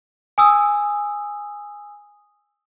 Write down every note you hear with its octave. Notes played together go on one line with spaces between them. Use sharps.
G#5 D#6 E6